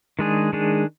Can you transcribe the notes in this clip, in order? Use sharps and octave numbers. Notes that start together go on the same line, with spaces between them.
D#3 G#3 D4 G#4
D#3 G#3 D4 G#4